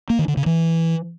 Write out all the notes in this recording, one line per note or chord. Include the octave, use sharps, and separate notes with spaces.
A#3
D#3
D3
C#3
E3